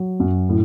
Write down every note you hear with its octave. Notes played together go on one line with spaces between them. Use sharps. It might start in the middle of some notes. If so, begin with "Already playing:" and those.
Already playing: F#3
F#2
A2